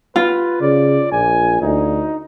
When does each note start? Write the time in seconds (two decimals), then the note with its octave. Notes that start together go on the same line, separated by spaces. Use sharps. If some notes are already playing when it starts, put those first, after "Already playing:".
0.16 F4 B4
0.61 C#3 D5
1.12 A#1 G#5
1.61 D2 D#4